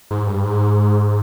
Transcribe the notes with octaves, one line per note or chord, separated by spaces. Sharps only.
G#2
G2
G#2